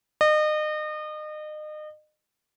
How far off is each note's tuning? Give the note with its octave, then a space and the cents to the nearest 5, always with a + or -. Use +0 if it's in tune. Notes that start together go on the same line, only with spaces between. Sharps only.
D#5 -35